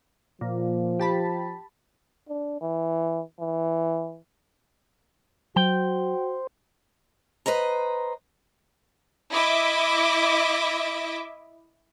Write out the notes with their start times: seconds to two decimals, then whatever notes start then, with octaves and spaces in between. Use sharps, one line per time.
0.41 A#2 F3
0.99 G4 A5 B5
2.28 D4
2.61 E3
3.39 E3
5.56 F#3 F#4 C5 G5
7.46 B4 C5 D#5 A#5
9.32 E4 D#5 E5 D6